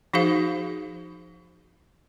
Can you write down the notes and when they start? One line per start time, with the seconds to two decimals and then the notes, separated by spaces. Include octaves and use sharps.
0.13 F3 D#4 F#4 G#4 C5 F5